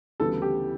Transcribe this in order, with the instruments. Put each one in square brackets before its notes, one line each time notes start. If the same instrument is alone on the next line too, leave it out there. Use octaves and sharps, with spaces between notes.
[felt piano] D2 C#3 E3 G3 B3 [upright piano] A4
[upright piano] G4